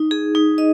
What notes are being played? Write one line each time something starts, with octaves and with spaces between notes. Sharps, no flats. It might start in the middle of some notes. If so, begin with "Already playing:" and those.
Already playing: D#4
G#4
D#4
D#5